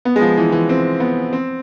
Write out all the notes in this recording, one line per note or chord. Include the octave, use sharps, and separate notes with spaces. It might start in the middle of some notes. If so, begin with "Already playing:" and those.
B3
G#3
F3
E3
E3
C4
B3
C4